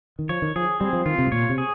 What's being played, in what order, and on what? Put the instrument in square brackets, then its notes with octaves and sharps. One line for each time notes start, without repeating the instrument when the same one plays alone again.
[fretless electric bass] D#3
[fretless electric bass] F3 [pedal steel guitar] C#5
[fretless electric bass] D#3
[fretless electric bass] F3 [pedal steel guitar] G#4
[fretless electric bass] G3 [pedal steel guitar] C4
[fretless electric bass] F3
[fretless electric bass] D#3 [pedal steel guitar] F4
[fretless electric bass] C3
G#2
[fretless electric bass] A#2 [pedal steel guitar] C#5
[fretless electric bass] C3
[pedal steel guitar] G#4